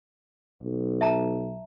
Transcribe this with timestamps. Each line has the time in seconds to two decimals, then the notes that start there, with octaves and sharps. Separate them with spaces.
0.63 B1
1.01 E5 A5 A#5